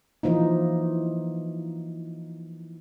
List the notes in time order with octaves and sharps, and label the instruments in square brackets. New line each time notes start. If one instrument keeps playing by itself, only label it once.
[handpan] E3 F3 A#3 D#4